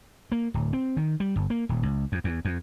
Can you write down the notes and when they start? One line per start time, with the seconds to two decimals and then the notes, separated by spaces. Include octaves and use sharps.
0.32 A#3
0.54 D1
0.73 C4
0.97 D#3
1.20 G3
1.36 G1
1.50 A#3
1.69 D#1
1.83 C#2
2.12 F2
2.24 E2
2.45 F2